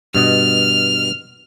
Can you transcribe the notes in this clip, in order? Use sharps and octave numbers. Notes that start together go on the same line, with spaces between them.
G2 B2 D#5 F6